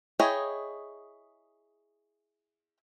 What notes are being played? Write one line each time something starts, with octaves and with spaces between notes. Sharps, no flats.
E4 G#4 C#5 D#5 G5